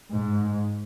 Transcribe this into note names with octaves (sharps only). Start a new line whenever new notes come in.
G#2